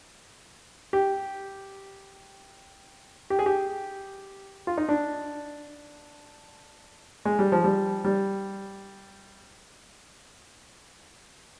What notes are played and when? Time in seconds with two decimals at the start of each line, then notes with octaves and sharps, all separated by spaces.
0.93 G4
3.30 G4
3.39 G#4
3.46 G4
4.67 F4
4.78 D#4
4.89 D4
7.25 G#3
7.39 G3
7.52 F3
7.64 G3
8.04 G3